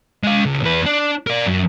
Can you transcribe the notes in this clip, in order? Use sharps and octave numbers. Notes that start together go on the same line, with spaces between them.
G#3 F5
C#2
E2 B4
D4
A#4 D5
F#2